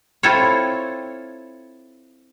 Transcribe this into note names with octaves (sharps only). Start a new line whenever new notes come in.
C4 E4 F4 A4 C5 C#5